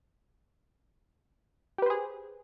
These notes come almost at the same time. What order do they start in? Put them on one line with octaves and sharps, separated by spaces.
G4 B4 C5 G#4